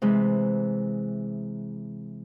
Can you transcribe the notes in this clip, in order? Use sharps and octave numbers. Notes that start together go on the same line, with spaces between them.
C3 E3 G#3